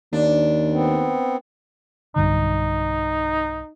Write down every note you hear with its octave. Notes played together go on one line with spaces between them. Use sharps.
D#2 D4
B3 C4
B1 G2 D3 D#4